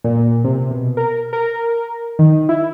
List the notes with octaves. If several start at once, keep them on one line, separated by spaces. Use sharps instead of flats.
A#2
C3
B2
A#4
A#4
D#3
E4